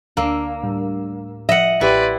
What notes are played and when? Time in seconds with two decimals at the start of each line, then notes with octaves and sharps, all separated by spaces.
0.17 D2 A#3 D4 A#4 E6
0.63 A2 G3
1.49 F3 D#5 E5 F#5
1.81 A1 E4 G4 B4 D5 C6